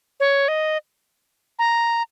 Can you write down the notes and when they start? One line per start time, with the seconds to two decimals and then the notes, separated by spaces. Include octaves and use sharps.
0.20 C#5
0.48 D#5
1.59 A#5